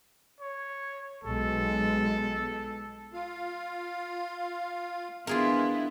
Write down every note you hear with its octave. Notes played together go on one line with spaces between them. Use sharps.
C#5
B1 G#3 A4
F4 F5
E3 G#3 B3 D4 E4 F4 G#4 A#4